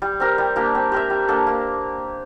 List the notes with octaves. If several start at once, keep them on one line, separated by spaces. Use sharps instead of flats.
G3
C4 G4 A#4
G3
A#3 D4 G4
C4
G4 A#4 E5
G3
A#3 D4 A4
A#3